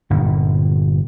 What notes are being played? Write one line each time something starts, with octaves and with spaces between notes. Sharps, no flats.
G1 A#2